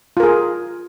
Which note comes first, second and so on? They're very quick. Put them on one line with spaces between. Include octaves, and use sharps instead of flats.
F4 A#4 G#4